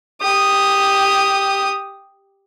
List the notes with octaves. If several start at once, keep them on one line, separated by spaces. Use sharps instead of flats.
G4 D#6